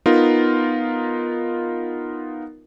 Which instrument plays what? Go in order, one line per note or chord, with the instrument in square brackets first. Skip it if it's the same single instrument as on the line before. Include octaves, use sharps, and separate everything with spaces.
[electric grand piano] B3 D#4 F4 A#4